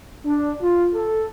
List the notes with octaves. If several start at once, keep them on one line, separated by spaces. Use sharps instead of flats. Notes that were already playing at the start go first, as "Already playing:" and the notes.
D4
F4
A4